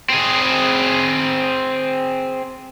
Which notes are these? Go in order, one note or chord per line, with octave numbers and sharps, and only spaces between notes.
C4 G#4